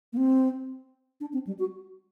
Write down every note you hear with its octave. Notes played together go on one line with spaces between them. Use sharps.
A#3
C4
D4
C4
G3
F#4